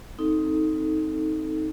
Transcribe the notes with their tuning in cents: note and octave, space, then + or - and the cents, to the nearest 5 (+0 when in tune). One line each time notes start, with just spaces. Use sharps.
C4 +0 D#4 +10 A4 +5